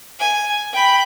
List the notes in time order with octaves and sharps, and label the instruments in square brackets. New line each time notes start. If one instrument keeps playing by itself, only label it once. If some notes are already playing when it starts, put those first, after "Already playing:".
[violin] G#5
G5 B5